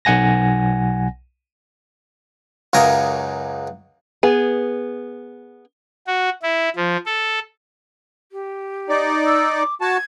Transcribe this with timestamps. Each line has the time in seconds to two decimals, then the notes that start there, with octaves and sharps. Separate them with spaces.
0.05 B1 F#5 G#5 A#6
2.73 C#2 F#2 C#3 A#4 G#5 D#6
4.23 B3 G#4
6.07 F#4
6.43 E4
6.76 F3
7.06 A4
8.31 G4
8.89 D#4 D5
9.25 E6
9.55 D6
9.81 F#4 A5 G#6